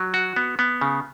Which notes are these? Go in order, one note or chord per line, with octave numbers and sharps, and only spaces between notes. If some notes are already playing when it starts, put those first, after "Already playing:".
Already playing: F#3
F#4
B3
B3
C#3